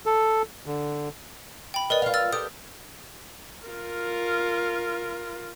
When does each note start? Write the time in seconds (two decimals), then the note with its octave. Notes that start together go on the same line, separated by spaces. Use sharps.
0.06 A4
0.66 D3
1.74 G5 B5
1.90 A#4 B4 D5 D#5
2.02 F4 F5
2.14 E6 F6 A6
2.33 G4 A4 D#6
3.67 F4 A#4